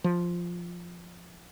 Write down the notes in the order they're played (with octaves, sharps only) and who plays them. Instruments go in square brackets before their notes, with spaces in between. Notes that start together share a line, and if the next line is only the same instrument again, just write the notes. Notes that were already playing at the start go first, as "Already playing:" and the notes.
[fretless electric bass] F3